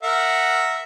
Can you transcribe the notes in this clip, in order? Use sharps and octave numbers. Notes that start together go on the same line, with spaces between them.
A#4 E5 F#5